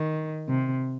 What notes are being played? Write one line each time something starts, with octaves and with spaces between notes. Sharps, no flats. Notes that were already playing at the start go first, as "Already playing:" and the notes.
Already playing: D#3
C3